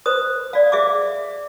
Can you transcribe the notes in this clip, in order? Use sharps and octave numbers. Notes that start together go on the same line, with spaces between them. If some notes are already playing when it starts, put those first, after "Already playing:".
B4 C5 D#6
D5 F5
G#4 E5 F5 D6